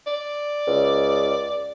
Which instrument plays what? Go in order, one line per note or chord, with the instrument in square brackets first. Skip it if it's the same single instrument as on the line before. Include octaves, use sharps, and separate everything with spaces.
[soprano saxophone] D5
[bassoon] C#2